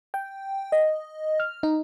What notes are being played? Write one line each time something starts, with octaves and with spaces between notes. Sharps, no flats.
G5
D#5
F6
D#4